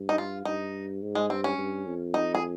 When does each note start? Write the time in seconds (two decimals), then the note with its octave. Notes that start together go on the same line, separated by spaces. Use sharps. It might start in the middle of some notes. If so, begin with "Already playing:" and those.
Already playing: G2
0.09 D#4
0.18 F4
0.45 G2 D#4
1.02 G#2
1.15 G#3
1.30 G2 C4
1.44 C#4
1.58 G2
1.86 F2
2.14 D#4
2.35 G#4